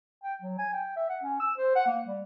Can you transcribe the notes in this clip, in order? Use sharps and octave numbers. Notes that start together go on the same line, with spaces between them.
G5
F#3
G#5
G5
E5
F#5
C#4
E6
C5
F#5
A#3
G3